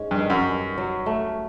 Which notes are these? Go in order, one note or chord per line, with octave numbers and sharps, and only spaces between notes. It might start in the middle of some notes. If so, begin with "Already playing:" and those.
Already playing: G#2 G#3 C#4
G2
D#3
F#2
G2
F#3
A3